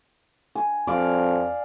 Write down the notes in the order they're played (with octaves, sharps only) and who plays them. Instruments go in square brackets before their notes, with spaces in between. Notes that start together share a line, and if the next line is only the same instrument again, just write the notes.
[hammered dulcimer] G#5
[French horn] F2 [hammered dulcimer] D5 F5